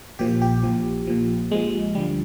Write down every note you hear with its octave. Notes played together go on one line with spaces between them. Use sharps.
A#1 A#2 F3 G4
G4
A#1 A#2 F3
A#1 A#2 F3
A#1 A#2 F3 G#3
D2 D3 F3 G3